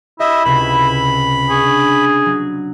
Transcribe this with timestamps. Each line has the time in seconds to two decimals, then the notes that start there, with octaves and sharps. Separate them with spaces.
0.20 E4 G4 D#5 E5
0.45 C#2 C3 B5
1.50 D4 G#4 C#6
2.26 F#3